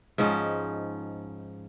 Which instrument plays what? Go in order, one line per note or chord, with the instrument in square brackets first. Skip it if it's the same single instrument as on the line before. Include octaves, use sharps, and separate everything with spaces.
[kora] G#2 F3 C#4 D#4